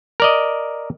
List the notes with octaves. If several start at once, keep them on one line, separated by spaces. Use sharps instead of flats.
A#4 D5 D#5